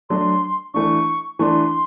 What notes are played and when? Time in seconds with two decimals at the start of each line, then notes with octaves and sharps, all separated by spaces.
0.10 F#3 A3 D4 C6
0.74 E3 A3 D4 C#6
1.39 E3 A3 D4 C6 C#6